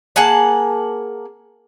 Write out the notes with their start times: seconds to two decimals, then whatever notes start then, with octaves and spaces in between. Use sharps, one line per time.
0.16 A#3 G#4 F#5 A5